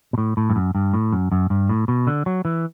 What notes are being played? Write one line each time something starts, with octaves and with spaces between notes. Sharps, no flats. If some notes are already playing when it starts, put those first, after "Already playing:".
B2
A2
A2
G2
F#2
G2
A2
F#2
F#2
G2
A2
B2
D3
F#3
E3